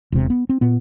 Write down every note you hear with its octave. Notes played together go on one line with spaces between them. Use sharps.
E1 C3
B3
C4
A#2 B3